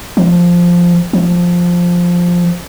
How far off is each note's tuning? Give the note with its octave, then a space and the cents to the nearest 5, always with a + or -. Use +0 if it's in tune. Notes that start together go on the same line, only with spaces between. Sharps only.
F3 +0
F3 +5